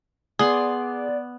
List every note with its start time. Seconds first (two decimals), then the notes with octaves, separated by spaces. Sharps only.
0.39 B3 G#4 D5 C6